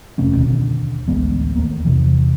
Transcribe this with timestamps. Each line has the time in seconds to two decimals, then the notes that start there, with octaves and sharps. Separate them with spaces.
0.18 F1 C3 A3 C#4
0.36 D#2 B2 D3
1.08 A1 D2 G#3 B3
1.56 D#2 A3 A#3
1.85 E2 C3 E3